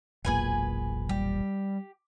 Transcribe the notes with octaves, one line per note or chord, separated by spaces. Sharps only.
E1 B1 A#2 G#4 B4 G#5
G3 G4